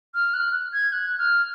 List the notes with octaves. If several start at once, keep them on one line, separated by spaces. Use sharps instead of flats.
F6
F#6
G#6
F#6
F6